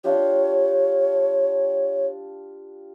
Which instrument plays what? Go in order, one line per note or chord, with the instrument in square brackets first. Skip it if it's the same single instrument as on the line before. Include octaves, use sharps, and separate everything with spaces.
[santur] D4 F4 G4 [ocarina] C#5